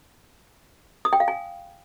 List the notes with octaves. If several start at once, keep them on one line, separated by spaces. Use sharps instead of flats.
D#6
G5
F5
G#5